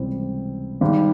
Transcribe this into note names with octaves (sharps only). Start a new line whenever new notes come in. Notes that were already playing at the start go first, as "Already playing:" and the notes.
Already playing: C#2 C3 E3 G3 C4
G#1 G#2 G3